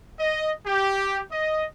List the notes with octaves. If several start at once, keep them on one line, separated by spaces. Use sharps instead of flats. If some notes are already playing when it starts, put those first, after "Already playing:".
D#5
G4
D#5